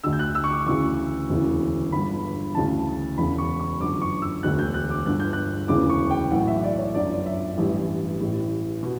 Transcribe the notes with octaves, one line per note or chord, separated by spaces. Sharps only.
D2 D3 E6
G6
F#6
E6
C#6
D6
D2 C#3 E3 C#6
E1 D2 C#3 E3
G1 G2 D3 B5
D2 C#3 E3 A5
E1 E2 C#3 E3 B5
C#6
C#6
G1 F#2 D3 D6
C#6
E6
E1 D2 D3 F#6
G6
F#6
D6
G1 G2 D3 F#6
G6
F#6
E1 D2 C#3 E3 D6
C#6
G5
B1 A2 E3 F#5
E5
D5
C#5
G1 F#2 D3 D5
E5
A1 G2 E3 G4
A1 A2 E3 G4
B2